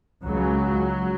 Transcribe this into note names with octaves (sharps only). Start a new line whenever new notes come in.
C#2 F#3
C#3